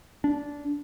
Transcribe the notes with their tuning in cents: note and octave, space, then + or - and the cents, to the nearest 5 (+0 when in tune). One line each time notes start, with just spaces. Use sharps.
D4 -15